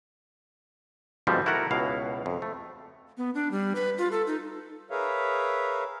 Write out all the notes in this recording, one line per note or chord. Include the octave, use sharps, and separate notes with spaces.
D2 G#2 B2 F3 G3 C4
E4 F#4 A4 A#4 F#5 A#5
C#2 B2 E4 F5
F2
A3
B3
D4
G3
B4
F4
A4
D#4
G#4 A#4 B4 C#5 E5 F5